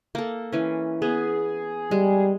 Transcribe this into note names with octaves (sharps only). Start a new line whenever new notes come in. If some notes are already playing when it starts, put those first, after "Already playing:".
A#3 A4
E3 C#4
B3 G#4
G3 G#3